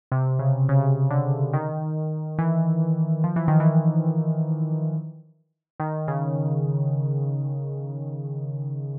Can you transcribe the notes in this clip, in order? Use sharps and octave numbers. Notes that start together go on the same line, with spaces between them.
C3
C#3
C#3
D3
D#3
E3
F3
E3
D#3
E3
D#3
C#3